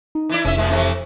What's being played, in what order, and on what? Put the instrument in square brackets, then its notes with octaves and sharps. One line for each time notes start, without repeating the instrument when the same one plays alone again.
[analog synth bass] D#4
[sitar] E3 E4 D5
[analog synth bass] F1 [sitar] C#4 E5
[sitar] A#2 F3 G#3
C3 E3 A3